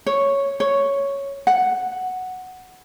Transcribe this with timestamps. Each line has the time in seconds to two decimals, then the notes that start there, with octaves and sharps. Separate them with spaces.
0.06 C#5
0.60 C#5
1.47 F#5